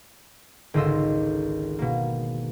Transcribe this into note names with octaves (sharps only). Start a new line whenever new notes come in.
G#1 C#2 D3 D#5 C6 E6
B2 A#3